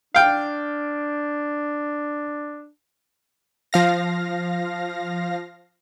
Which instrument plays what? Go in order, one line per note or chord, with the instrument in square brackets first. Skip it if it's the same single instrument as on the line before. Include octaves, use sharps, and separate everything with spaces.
[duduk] D4 [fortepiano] F5 G5
[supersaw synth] F3 F5 A#6